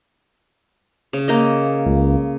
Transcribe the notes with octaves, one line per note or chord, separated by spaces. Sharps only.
C#3
A#3 D#5
C#2